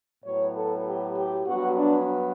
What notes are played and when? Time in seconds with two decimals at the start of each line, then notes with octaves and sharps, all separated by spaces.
0.25 A2 F#3 B3 C#5
0.55 A4
0.86 G4
1.17 G4
1.46 G2 F#3 B3 F#4
1.77 D4